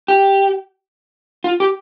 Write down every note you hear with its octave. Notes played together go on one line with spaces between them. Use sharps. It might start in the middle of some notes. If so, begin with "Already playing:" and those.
G4
F4
G4